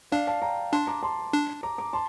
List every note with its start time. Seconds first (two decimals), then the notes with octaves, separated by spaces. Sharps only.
0.12 D4 D5 F5
0.27 F5 A5
0.42 G5 A#5
0.72 D4 A5 C6
0.87 A#5 D6
1.03 A5 C6
1.33 D4
1.63 A#5 D6
1.78 A#5 D6
1.93 A5 C6